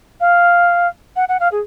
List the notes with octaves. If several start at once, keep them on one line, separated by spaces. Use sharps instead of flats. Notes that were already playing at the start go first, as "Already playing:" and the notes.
F5
F#5
F#5
F5
G#4